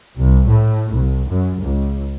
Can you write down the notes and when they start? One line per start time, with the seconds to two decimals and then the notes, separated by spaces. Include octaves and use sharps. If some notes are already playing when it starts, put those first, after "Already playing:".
0.16 C2
0.49 A2
0.94 C2
1.28 F#2
1.63 C#2